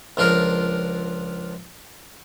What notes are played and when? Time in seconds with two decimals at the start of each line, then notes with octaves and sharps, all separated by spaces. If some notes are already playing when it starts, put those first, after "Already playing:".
0.17 C#2 F3 D4 F4 A#4